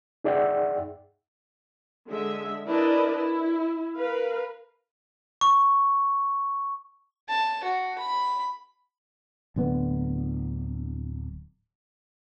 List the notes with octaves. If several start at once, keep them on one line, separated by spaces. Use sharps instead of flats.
D#4 G#4 D5 E5 F#5 G5
D3 G#3 E5
D4 E4 A#4 B4 D5 D#5
E4
A#4 B4 F5
C#6
A5
F#4
B5
D1 D3 B3